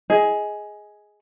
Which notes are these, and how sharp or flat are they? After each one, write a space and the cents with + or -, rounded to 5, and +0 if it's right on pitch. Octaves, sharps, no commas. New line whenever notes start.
G#4 +5 D#5 +20